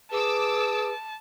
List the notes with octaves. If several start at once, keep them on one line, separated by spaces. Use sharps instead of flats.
G#4 B4 A5 D6 E6